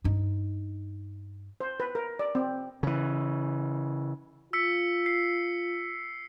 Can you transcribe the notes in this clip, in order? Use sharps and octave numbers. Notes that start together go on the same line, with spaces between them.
G2 D#4
C5
B4
A#4
D5
C4
C#3 E3
F4 E6 B6 C#7
C7